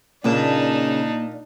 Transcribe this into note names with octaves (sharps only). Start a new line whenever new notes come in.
A#2 C#3 A#3 D4 D#4 B4 A5